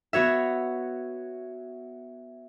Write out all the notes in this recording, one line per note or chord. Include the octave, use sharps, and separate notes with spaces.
B3 F#4 C#5 E5